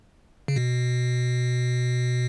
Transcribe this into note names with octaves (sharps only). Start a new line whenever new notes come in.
C#3
B2